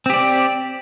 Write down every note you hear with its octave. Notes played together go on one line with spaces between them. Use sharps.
C4 G4 D5